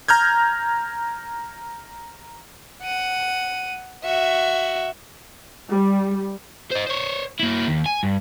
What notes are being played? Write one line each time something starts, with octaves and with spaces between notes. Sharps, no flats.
A#5 F6 G6 G#6
F#5 D#7
F#4 E5
G3
C5 D#5
C5 C#5
A#3 E4
D#2
G#5
G2